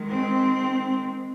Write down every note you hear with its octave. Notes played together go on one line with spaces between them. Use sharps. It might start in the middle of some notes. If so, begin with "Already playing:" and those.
Already playing: D#3 G#3
C4